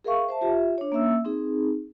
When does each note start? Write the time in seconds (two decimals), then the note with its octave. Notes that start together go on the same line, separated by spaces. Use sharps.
0.04 G#4 A#4 E5 F5 C#6
0.29 C5 E5 A5
0.41 F4 G4 E5
0.78 D4 C#5
0.92 A#3 C#4 E5 E6
1.25 C4 D#4 G#4